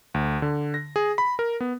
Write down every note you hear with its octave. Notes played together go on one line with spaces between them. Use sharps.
D2
D3
A#6
G#4
B5
A#4
B3